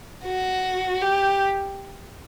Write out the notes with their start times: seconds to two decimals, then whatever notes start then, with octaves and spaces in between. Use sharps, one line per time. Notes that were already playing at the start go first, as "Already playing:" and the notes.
0.24 F#4
1.01 G4